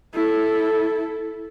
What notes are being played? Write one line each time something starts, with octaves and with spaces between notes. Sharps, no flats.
E4 A4